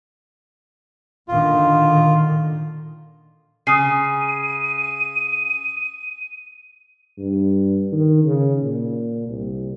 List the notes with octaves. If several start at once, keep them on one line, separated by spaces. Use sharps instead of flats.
A#2 D3 D#3 F4
C#3 D#6 C7 D#7
G2
D#3
C#3
A#2
C2